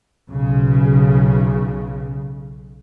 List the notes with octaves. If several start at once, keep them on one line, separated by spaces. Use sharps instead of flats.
B1 C#3